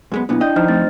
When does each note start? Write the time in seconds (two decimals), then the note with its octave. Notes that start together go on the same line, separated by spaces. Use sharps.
0.12 F#2 G#3 B3
0.29 B1 A#2 B3 D4 E4
0.41 D4 D#5 G5 G6
0.56 F3 D#4 C5 D#5 F6
0.68 A3 C4 A6